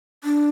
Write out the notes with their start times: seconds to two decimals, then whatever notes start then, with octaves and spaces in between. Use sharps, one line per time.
0.24 D4